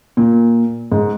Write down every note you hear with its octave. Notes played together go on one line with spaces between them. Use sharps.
A#2
G#2